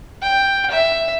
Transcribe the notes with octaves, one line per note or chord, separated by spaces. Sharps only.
G5
E5